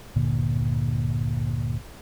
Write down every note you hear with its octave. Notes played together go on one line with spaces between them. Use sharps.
G1 D2 A#2 D3